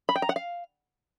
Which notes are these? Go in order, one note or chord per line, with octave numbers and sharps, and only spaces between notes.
B5
G5
A#5
F#5
F5